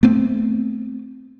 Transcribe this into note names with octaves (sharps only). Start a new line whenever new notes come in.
A3 B3 C4